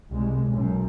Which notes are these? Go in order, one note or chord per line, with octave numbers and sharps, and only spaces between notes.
C2 G#3
B1 F#2